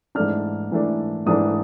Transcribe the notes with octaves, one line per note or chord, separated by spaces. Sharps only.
G#2 E3 A3 D4 F6
G#2 E3 A3 D4
G#2 E3 A3 D4 D#6